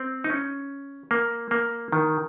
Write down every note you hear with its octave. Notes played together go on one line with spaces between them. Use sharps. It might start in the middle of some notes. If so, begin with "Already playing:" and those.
Already playing: C4
D#4
C#4
A#3
A#3
D#3